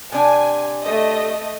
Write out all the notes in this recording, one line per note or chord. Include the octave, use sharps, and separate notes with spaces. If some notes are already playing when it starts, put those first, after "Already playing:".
C3 D4 G#5
A3 D#5